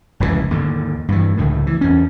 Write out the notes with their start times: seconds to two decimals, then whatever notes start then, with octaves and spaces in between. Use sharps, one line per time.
0.20 F1 C#2 G#2 E3
0.51 D#2 G#2 D3
1.08 G2 E3
1.37 C#2 A2 D3 D#3
1.67 E3
1.81 E2 C#4